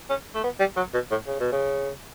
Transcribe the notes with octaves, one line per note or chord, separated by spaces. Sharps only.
C#4
A3
B3
G3
F#3
B2
A2
C#3
B2
C#3